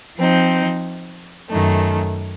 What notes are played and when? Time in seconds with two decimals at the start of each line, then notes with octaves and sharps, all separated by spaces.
0.18 F3 C4 D#4
1.50 F#2 D#3 A3